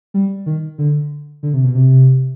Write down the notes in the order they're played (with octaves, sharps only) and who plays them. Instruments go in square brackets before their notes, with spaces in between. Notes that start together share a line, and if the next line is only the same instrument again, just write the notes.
[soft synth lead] G3
D#3
D3
D3
C3
B2
C3